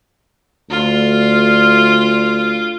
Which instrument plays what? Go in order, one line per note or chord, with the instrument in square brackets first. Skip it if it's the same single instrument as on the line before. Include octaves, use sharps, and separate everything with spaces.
[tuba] D2 [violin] F4